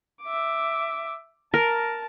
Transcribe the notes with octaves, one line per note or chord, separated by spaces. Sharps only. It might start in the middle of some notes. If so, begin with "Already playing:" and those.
E5 D6
A#4 A5